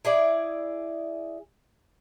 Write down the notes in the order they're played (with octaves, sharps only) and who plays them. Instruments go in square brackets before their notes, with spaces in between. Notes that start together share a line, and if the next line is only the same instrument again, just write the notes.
[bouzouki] E4 G#4 D5